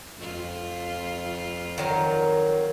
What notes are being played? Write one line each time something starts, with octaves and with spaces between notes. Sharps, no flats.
F2 F4
D#3 F#3 A#4